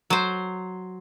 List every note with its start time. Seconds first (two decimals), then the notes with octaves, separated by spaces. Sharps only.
0.10 F#3 C5